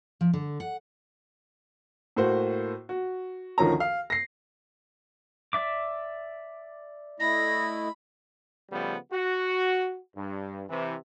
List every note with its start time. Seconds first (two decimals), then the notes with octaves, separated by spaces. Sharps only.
0.21 F3
0.33 D3
0.60 F#5
2.16 A2 A#3 F#4 C5
2.89 F#4
3.58 D2 D#3 F3 C#4 A#5
3.80 F5
4.10 A#6 C7
5.53 D5 E5 D6
7.20 A3 E4 D#5 B5 A#6
8.71 C#3 F3 G3 A3 B3
9.12 F#4
10.16 G2
10.69 C3 E3